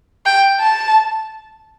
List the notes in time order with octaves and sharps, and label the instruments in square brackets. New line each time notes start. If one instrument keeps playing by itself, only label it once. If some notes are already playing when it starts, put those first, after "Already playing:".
[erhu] G5
A5